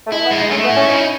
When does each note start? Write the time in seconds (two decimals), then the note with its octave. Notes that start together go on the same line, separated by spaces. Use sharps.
0.07 A3
0.12 G#3 E4
0.25 B3
0.31 G#3
0.38 D#4
0.50 A3 C#4
0.64 B3
0.69 E4
0.76 C#4
0.89 D#4